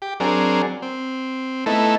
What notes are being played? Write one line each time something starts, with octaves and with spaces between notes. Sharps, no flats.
G4
F#3 C4 D4 G#4 A#4
C4
A3 B3 D#4 E4 A4